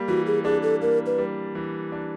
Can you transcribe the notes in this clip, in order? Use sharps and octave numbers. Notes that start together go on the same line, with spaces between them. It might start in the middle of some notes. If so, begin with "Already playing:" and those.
Already playing: G3 A#3
E3 F#4
G#4
D4 G#4
A4
A#3 A#4
B4
G3
E3
D4